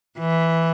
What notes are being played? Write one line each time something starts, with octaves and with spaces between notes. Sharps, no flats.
E3